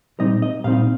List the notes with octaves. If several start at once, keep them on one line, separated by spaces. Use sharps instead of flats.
A#2 G3 C4 D#4 D#5
D#5
A#2 G3 C4 D#4 F5